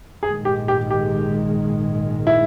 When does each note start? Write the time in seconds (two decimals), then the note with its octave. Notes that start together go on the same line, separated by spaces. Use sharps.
0.23 A#1 G#2 D#3 G#3 G#4
0.45 G4
0.68 G4
0.91 G4
2.27 E4